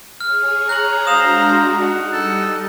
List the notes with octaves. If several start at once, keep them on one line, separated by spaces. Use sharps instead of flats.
G#4 C#5 F6
A#5 F#6 F#7
G#3 D4 F#4 C5 F5 D#6 E7 F7
D#4 D#5 F#5
G3 A4